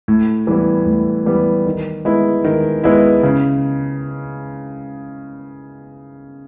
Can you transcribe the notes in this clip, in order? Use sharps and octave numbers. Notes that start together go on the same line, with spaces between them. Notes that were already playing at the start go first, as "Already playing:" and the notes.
A2
E3 G3 B3
A2
E3 G3 B3
D#3
G#3 B3 E4
D#3
G#3 B3 E4
C#3